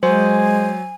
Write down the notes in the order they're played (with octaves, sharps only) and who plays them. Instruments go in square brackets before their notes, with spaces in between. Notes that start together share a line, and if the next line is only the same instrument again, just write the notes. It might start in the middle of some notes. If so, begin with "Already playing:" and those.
[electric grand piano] F#3 [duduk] G#3 [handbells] C5 [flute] G#5